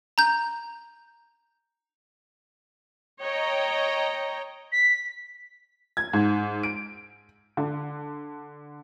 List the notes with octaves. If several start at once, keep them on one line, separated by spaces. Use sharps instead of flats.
A#5 G6
C#5 D#5 G5 A#5
B6
G#6
G#2
D7
D3